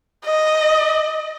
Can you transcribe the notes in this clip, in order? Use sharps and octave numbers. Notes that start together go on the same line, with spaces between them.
D#5